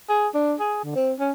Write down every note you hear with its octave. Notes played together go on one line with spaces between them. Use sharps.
G#4
D4
G#4
D3
C4
C#4